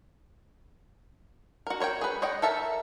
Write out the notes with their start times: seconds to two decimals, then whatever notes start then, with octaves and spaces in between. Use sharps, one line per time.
1.67 F#4 A#4
1.80 A#4 C#5 D#5 G5
2.01 G#4 B4
2.22 C#5 D#5 F#5 G5
2.42 A4 A#4 E5 A5